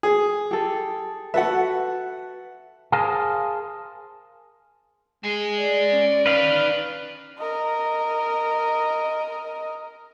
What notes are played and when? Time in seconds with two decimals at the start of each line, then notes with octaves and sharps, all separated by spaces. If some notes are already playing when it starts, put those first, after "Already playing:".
0.03 G#4
0.51 G4 A4
1.34 F#4 A4 B4 E5 F#5
2.92 G#4 A#4 C5 F5 G#5 A5
5.24 G#3 D#5 G#5
5.60 D5
5.93 C#4
6.26 D#4 B4 F5 G5
7.38 A#4 D#5